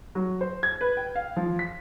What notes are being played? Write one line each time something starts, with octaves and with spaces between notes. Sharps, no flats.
F#3
C5
G#6
B4
G5
F5
F3
B6